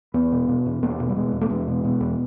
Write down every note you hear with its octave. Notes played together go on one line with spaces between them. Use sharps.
E2 B3
B2
B2
E2
E2 A#3
B2
G3
B2 G#3
E2
A3
E2 G#3
B2
B2
E2